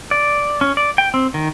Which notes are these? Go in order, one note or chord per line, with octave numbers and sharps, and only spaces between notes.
D5
C#4
D5
G5
C4
D#3